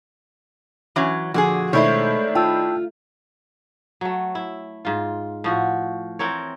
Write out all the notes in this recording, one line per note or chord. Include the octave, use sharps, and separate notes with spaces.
E3 F#3 C#4
A#2 D3 F3 F#4 G#4
B2 D#3 G#3 A3 D4 E4 C5 C#5
F4 G5 A5 E6
F#3 A3
E4
G#2 F4
A2 F3 F#4
E3 C4 A#4 C#5